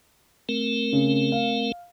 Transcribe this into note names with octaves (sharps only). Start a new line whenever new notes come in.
A3 C4 A#4
C#3
F5